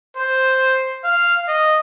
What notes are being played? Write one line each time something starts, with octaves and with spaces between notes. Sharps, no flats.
C5
F5
D#5